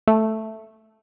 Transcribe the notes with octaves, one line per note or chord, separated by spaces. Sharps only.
A3